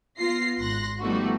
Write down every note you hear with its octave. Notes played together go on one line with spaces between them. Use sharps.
B3 F4 A#6 C7
G#1 C6 F#6 A#6
F3 G3 A3 B3 D#4 F#4